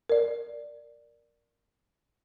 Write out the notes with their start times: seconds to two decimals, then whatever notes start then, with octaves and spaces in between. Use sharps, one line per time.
0.10 A#4 D5